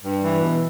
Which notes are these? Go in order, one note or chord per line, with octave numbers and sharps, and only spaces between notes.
G2
E3
B2